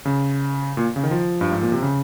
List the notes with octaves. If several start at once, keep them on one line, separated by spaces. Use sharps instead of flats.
C#3
A#2
C#3
D#3
F3
G2
G#2
A#2
C3
C#3